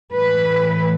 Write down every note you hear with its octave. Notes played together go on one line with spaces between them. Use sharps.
A2 E3 B4